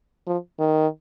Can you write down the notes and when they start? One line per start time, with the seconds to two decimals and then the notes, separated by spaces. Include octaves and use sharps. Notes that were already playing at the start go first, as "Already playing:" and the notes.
0.27 F3
0.59 D#3